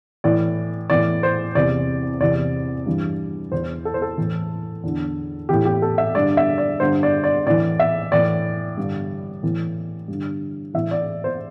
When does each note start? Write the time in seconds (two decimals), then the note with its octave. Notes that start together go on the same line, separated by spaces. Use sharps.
0.24 A2 E3 D5
0.90 A2 E3 D5
1.23 C5
1.55 E2 C3 E3 D5
2.21 E2 C3 E3 D5
2.86 G2 E3
3.52 E2 E3 C5
3.85 A4
3.94 C5
4.02 A4
4.17 A2 E3
4.84 E2 D3
5.49 A2 E3 G4
5.65 G4
5.82 A4
5.98 E5
6.15 G2 D3 D5
6.37 E5
6.58 D5
6.80 G2 D3 C5
7.03 D5
7.24 D5
7.46 A2 E3 D5
7.80 E5
8.12 A2 E3 D5
8.78 G2 D3
9.43 A2 E3
10.08 G2
10.13 D3
10.74 A2 E3 E5
10.91 D5
11.24 C5